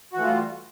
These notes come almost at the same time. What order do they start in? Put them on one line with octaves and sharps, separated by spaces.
F#4 E3 A3 F4 G3